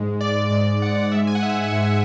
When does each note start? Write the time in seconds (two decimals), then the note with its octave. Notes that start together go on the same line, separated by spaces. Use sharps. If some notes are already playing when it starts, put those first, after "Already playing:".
Already playing: G#2 G#3
0.21 D5
0.51 G#2 G#3 D5
0.82 F#5
1.12 G#2 G#3 E5
1.27 G#5
1.35 F#5
1.43 E5
1.72 G#2 G#3 F#5